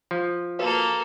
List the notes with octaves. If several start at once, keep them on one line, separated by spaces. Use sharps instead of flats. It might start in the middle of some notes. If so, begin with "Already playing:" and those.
F3
A#3 F#4 A4 B4 F5